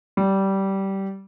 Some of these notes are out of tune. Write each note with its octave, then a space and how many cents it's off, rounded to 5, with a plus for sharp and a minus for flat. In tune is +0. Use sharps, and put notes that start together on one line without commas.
G3 -15